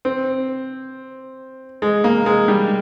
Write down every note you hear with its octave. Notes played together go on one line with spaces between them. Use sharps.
C4
G#3
A#3
G#3
G3